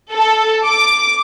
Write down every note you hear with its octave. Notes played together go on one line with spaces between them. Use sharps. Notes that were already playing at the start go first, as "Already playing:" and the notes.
A4
D6